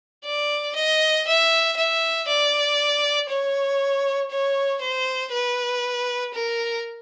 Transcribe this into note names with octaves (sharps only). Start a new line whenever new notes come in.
D5
D#5
E5
E5
D5
C#5
C#5
C5
B4
A#4